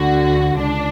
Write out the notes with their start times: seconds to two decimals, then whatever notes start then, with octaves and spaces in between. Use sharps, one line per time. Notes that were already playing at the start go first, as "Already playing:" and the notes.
Already playing: D2 D3 F#4
0.57 C#2 D4